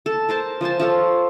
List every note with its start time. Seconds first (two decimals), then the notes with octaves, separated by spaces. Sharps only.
0.06 A4
0.29 A#4 C5 A5
0.61 F3 C5 G#5 A5
0.80 F3 F4 A4 C#5